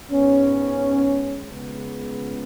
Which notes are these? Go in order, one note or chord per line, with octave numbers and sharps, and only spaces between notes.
G#2 G#3 B3 C#4
C#2 C#3 G#3 B3